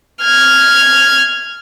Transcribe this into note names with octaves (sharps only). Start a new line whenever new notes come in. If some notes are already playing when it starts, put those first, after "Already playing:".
F6 G#6